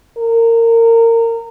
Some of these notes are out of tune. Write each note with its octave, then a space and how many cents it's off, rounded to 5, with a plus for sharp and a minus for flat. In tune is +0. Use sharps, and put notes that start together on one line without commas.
A#4 -25